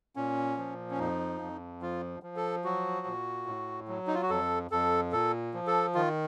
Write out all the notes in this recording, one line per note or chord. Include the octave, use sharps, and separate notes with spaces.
A#2 C#4
F3
C#4
F2 D#4
F2
F3 F4
F3
A4
F#3 F#4
A#2
A2
F#3
D#4
F4
F#4
F2 A4
F2 A4
A#2 A4
F3
A4
D#3 F4